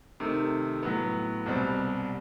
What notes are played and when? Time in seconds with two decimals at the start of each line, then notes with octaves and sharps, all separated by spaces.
0.20 C3 D#3 A3
0.83 A2 F#3 B3
1.46 C2 B2 G3 C4